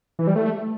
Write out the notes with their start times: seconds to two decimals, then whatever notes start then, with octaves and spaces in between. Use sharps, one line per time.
0.19 E3
0.27 G3
0.36 A3